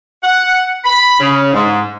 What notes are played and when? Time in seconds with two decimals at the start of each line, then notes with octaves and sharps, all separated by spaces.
0.23 F#5
0.85 B5
1.20 C#3
1.53 G#2